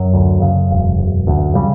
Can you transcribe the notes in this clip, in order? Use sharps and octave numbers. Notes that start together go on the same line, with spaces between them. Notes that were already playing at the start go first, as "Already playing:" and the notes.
Already playing: F#2 F#3
D2
C#3
E1
E1
D2
C#3 G3